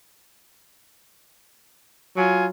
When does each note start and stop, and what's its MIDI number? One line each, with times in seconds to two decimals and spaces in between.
2.16 2.50 54
2.16 2.45 65
2.16 2.45 80